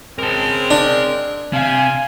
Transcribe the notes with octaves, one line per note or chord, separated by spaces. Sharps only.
C#3 G#3 C4 A#4 A5
D4
C3 C4 F5 G#5